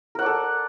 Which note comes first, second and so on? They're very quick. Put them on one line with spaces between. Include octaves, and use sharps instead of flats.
A#4 F#5 D5 A4